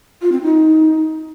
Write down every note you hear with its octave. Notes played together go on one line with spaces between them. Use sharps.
F4
C4
D#4